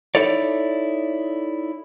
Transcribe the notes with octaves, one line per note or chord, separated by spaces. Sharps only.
D#4 E4 A4 C#5 D5